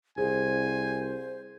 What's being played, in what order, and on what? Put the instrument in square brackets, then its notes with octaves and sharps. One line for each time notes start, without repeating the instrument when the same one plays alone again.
[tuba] C2 [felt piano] G#4 [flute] C5 [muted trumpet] G#5